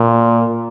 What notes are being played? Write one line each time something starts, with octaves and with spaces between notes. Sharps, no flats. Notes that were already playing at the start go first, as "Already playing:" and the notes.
Already playing: A#2